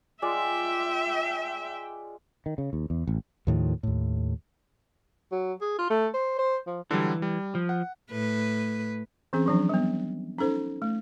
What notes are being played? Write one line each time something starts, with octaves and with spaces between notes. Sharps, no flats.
G#3 F4 D5 E5 G5
D#3
C#3
D#2
E2
A1
D#2 A2 D#3 F3
D#2 A2
F#3
G#4
F4
A3
C5
C5
F3
D3 E3 F#3 G3
G3
F3
F#5
A2 B4
E3 C4 C#4 G#4
F3 F#3 D4
G3 B3
C#4 D#4 A4 C5
A3